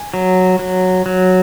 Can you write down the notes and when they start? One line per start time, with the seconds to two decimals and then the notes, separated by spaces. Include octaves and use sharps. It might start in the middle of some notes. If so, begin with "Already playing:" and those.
Already playing: G#5
0.14 F#3
0.59 F#3
1.06 F#3